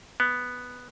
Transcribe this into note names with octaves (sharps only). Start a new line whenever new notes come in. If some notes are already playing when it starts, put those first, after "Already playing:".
B3